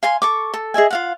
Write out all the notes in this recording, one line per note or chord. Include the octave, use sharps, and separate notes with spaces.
F5 G#5 C6
A4 C#6 D6
A4
G#4 D#5 E5 G#5
F4 F5 F#5